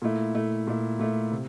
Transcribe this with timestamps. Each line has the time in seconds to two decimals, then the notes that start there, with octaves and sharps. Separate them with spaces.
0.02 A#2 A3 E4
0.35 A#2 A3 E4
0.67 A#2 A3 E4
0.99 A#2 A3 E4
1.32 C3